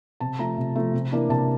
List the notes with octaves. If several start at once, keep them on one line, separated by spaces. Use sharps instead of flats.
C3 A5
F3 A3 A#5
C3
F3 A3
C3
E3 A#3 D4
C3 A5